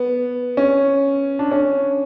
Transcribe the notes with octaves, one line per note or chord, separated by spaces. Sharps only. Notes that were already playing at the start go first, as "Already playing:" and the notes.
Already playing: B3
C#4
D4
C#4